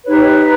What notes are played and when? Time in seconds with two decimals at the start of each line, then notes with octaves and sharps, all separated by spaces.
0.05 D#4 G4 B4 C#5
0.19 C#5
0.26 D#5